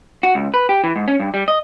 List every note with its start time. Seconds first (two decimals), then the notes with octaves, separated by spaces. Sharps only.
0.23 F#4
0.35 C#2
0.54 B4
0.69 G4
0.84 E3
0.96 G#2
1.08 C#4
1.20 G2
1.34 G3
1.48 D#5